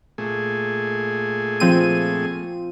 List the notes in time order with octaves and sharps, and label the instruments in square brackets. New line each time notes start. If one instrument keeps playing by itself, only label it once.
[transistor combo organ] A#2 A3 G#4
[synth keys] F3 C4 D#7